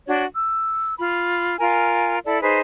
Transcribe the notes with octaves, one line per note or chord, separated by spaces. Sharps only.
D4 F#4 C#5
E6
F4 B5
F4 A#4 G#5
E4 A4 D5 A5
D#4 G#4 B4 C5